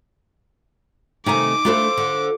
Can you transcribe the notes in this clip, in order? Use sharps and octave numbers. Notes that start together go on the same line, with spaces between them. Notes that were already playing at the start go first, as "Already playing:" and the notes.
C3 D#3 A3 D#4 G#5 A#5 D6
A3 D4 E4 F4 A4 C5
D3